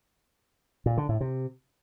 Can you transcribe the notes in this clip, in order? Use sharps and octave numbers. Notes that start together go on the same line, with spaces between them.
A#2
D3
A2
C3